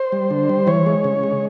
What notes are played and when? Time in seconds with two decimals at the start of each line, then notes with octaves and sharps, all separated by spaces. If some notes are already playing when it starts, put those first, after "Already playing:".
Already playing: C5
0.12 G3
0.30 D3
0.49 G3
0.67 E3 C#5
0.86 G#3
1.04 C#3
1.23 G#3